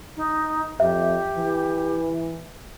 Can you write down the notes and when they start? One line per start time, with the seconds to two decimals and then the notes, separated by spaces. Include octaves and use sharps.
0.17 D#4
0.80 F2 G4 E5
1.34 E3